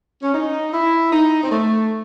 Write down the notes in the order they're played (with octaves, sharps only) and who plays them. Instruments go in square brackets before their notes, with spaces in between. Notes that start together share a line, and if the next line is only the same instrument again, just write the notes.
[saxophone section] C#4
D#4
E4
D#4
C4
A3